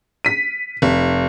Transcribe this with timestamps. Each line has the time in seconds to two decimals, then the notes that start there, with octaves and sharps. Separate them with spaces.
0.25 B6 D#7
0.82 F1